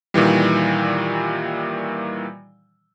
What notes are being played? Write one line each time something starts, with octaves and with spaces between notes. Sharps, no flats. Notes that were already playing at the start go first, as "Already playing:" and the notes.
A#2 D#3 E3 G3